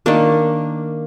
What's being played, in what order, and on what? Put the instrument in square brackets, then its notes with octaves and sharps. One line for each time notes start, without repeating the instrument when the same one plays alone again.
[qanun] D#3 A#3 D4